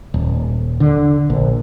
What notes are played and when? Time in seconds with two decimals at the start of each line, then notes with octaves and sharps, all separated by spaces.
0.14 D#1
0.80 D3
1.30 A#1